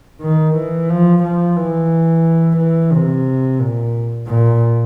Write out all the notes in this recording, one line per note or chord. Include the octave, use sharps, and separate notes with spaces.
D#3
E3
F3
F3
E3
E3
C3
A#2
A#2